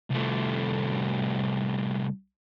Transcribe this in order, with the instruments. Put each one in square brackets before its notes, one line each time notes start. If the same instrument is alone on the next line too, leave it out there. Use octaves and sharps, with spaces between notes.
[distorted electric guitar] C2 A3